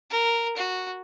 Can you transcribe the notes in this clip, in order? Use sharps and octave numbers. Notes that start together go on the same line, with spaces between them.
A#4
F#4